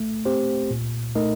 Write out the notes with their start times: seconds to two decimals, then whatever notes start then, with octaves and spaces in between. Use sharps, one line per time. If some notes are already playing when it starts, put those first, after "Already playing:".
Already playing: A3
0.25 C4 G4 C5
0.71 A#2
1.15 A3 D#4 A#4 D#5